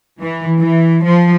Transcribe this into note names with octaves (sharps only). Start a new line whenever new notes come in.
E3
E3
F3